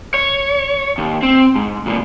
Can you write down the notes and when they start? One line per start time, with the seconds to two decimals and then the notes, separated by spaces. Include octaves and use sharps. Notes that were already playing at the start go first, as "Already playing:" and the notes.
0.14 C#5
0.98 D#2
1.23 C4
1.56 G#2
1.86 D2 A#2